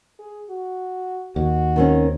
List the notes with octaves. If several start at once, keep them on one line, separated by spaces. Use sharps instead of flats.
G#4
F#4
D#2 F#4
D#3 C4 C#4